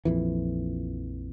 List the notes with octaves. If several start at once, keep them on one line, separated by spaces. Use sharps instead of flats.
A#1 F2 E3